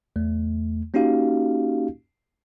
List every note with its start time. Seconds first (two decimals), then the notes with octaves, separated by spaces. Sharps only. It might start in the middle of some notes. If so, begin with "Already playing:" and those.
0.16 E2 A3
0.94 A#3 C#4 D#4 F#4 G4 F5